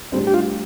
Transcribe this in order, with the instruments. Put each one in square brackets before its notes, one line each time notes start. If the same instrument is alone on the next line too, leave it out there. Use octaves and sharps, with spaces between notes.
[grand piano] A2 G3 D4 [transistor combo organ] C4
[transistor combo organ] G4
F4